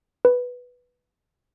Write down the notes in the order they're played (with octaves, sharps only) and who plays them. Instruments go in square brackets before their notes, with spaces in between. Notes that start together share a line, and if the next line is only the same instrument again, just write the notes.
[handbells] B4